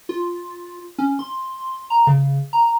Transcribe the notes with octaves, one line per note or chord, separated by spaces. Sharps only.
F4
C#4
C6
A#5
C#3
A#5